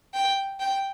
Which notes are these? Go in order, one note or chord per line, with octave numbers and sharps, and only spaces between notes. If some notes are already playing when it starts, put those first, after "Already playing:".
G5
G5